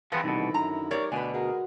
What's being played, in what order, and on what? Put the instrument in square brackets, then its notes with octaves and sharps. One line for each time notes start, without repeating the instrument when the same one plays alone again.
[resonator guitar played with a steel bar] E3 B4 [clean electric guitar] F3 B3 C4 [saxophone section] G#4 [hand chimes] B5 A6
[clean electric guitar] C2 B2 [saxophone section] D3 D#3 E4 [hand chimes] D#4
[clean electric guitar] F#2 [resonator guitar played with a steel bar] A#5
[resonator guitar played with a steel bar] A3 C#5 D5 [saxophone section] G4 A#4
[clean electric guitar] D2 B2 [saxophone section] D4 [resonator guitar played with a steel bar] B4 G#5
[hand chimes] F#4 F#5 [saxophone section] G#4 A#4